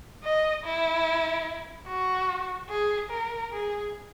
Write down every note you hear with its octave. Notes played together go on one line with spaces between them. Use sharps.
D#5
E4
F#4
G#4
A#4
G#4